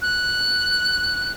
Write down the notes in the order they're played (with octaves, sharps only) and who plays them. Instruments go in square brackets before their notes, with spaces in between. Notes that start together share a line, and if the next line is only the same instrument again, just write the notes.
[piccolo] F#6